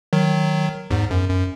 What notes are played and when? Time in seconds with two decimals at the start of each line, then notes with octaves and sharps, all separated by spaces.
0.13 D#3 F#3
0.90 E2 G#2
1.11 F#2
1.30 F#2